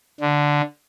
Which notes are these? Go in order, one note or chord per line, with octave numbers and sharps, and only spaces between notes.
D3